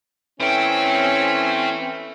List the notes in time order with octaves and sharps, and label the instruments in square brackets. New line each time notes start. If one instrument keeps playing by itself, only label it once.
[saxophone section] E3 A3 C#4 [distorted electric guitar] C4 G5